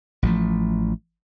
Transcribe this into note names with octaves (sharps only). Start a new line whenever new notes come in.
A1 F3 A3